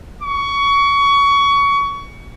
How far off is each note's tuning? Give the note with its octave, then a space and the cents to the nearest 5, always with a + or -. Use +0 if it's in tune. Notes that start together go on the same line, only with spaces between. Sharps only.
C#6 +25